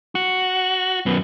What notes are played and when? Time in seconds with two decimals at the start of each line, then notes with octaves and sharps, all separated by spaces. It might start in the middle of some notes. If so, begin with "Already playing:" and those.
0.15 F#4
1.06 F#2 B3